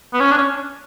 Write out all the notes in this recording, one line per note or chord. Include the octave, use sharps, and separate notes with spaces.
B3
C#4
D4
C#4